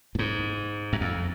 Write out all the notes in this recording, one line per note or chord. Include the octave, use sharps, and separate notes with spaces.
A2
G#2
F#2
F2